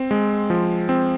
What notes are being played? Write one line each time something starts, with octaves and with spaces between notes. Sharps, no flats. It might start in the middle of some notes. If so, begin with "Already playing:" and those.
Already playing: C4
G#3
F3
C4